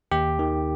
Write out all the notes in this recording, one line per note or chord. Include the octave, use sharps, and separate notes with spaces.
D#2 G4
D#3